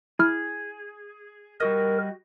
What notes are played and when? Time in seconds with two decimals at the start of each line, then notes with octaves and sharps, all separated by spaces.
0.19 E4 G#4 F6
1.60 G3 F#4 A#4 D#5